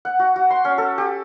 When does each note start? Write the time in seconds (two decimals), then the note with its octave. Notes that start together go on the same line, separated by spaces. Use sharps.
0.05 F#5
0.19 F#4
0.36 F#4
0.50 C6
0.65 C#4
0.78 A4
0.98 G4